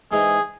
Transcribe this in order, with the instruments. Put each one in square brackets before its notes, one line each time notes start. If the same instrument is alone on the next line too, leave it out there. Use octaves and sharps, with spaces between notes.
[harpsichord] G#2 E3 G#3 D#4 [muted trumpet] G#4